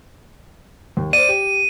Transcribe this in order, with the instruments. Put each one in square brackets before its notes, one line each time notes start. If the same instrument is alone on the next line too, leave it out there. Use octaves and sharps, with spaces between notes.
[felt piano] D#2
[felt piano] C5 D5 [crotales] D#7
[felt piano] G4